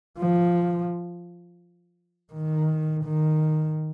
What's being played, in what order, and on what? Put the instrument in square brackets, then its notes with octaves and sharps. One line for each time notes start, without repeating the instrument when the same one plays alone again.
[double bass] F3
D#3
D#3